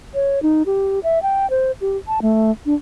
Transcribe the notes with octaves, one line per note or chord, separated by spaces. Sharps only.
C#5
D#4
G4
E5
G5
C5
G4
A5
A3
D4